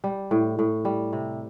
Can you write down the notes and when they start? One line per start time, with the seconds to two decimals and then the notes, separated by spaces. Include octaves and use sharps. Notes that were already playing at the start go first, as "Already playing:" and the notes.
0.04 G3
0.31 A2
0.59 A2
0.85 G3
1.13 C3